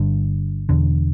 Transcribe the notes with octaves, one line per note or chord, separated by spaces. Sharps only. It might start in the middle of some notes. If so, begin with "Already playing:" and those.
Already playing: G1 G2 D3
E1 E2 D3